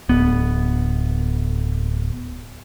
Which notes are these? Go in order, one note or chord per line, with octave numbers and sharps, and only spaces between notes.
D1 B3